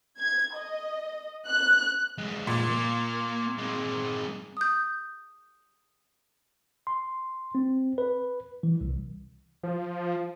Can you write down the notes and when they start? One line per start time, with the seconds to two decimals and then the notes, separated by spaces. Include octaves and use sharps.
0.19 G#6
0.56 D#5
1.48 F#6
2.18 F2 G#3
2.47 A#2
2.70 A#3
3.58 G#3 C4
4.57 D#6 G6
6.87 C6
7.55 C4
7.98 B4
8.63 E3
8.81 C2
9.63 F3